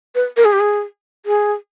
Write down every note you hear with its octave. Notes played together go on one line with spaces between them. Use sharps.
B4
A#4
G#4
G4
G#4
G#4